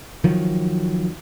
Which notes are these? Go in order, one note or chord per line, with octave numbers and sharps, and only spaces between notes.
D#3 F3 F#3